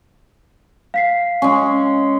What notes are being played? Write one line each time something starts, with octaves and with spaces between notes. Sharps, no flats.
F5 B6 C7
G#3 C#4